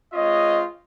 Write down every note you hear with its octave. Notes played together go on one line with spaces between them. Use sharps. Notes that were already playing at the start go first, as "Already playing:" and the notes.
G#3 C4 F4 C#5 D#5